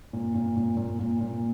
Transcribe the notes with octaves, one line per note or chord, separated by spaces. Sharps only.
A#2
A#2
A#2
A#2
A#2
A#2